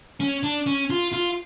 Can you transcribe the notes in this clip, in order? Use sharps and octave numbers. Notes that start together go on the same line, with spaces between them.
C#4
D4
C#4
F4
F4